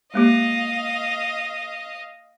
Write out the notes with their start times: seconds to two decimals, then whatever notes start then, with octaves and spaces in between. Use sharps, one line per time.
0.14 G#3 A#3 G4 D#5 F5